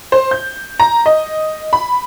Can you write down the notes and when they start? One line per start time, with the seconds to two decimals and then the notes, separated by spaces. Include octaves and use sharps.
0.12 C5
0.31 G6
0.80 A#5
1.06 D#5
1.73 B5